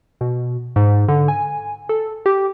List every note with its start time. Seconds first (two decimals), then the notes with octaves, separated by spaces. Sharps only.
0.21 B2
0.76 G#2
1.08 D3
1.28 G#5
1.89 A4
2.26 G4